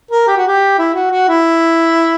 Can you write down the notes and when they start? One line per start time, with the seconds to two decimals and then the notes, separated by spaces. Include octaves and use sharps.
0.11 A#4
0.27 G4
0.37 F#4
0.47 G4
0.78 E4
0.94 F#4
1.11 F#4
1.28 E4